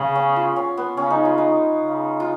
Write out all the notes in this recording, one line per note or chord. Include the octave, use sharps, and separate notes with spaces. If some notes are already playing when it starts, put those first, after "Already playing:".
Already playing: C#3 B3
C#4
F4
C#4
B3
C#3 C#4
D#4
F4
D#4
C#3
F4